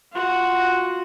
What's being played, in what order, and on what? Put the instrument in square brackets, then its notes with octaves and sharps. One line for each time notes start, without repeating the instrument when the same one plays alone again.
[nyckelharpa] F4 F#4